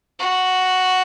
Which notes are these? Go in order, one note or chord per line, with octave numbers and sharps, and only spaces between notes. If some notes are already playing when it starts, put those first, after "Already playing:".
F#4